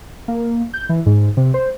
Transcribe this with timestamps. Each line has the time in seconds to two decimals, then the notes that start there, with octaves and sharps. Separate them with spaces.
0.28 A#3
0.74 G6
0.89 E3
1.06 G#2
1.37 C3
1.54 C5